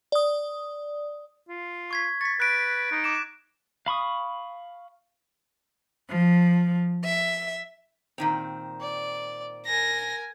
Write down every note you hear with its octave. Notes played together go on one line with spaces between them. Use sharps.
D5 D#6
F4
C#6 G#6 B6
C#6 A6 B6
B4 F#6 D7
D#4
D6 E7
F5 B5 C#6 D#6
F3
E5
A#2 D#3 C4
D5
A#4 G#5 A#6